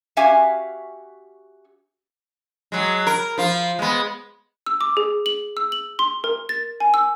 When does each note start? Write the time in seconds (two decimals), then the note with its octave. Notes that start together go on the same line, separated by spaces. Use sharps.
0.17 C#4 F#4 G4 E5 F5 G#5
2.72 F#3 G#3
3.07 A#4
3.38 F3 F4
3.79 G#3 B3
4.66 E6
4.81 D6
4.97 G#4
5.26 F#7
5.57 E6
5.72 F#7
5.99 C6
6.24 A#4
6.49 A6
6.80 G#5
6.94 E6